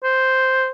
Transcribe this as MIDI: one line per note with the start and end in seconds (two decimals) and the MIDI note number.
0.04 0.69 72